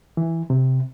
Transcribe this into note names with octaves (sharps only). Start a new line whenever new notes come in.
E3
C3